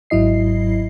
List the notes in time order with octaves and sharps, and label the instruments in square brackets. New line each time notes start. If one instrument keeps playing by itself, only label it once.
[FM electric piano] G#1 G#2 F#3 E4 D#5 C7